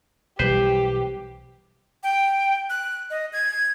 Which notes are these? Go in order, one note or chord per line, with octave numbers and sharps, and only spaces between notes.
B1 E3 G3 G4 B4 C5
G5
F#6
D#5
G#6